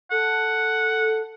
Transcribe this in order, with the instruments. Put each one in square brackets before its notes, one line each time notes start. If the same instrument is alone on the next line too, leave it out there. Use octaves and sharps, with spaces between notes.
[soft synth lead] A4 [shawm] F#5